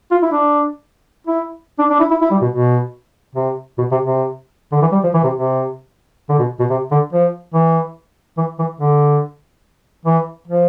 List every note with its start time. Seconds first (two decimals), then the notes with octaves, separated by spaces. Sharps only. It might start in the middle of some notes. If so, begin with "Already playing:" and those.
0.11 F4
0.22 E4
0.32 D4
1.27 E4
1.79 D4
1.90 D4
2.00 E4
2.11 E4
2.21 E4
2.31 G3
2.41 B2
2.52 B2
3.35 C3
3.78 B2
3.91 C3
4.05 C3
4.72 D3
4.82 E3
4.92 G3
5.03 F3
5.14 E3
5.24 C3
5.34 C3
6.29 D3
6.39 B2
6.59 B2
6.70 C3
6.91 D3
7.13 F3
7.54 E3
8.37 E3
8.59 E3
8.80 D3
10.06 E3
10.47 F3